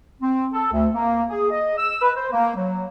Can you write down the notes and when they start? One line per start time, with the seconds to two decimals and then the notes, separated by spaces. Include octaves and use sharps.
0.22 C4
0.54 A4
0.73 D2
0.95 A#3
1.30 G#4
1.50 D#5
1.78 E6
2.02 B4
2.17 C5
2.32 A#3
2.56 F#3